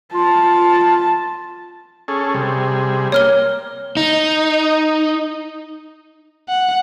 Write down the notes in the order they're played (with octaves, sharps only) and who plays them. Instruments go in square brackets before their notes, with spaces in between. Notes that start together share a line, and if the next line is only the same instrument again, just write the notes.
[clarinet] F4 [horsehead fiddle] A5
[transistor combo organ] C#4 G#4 A4
C3 G3 G#4
[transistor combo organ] A#3 [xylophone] C#5 F6 G7
[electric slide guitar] D#4
[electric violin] F#5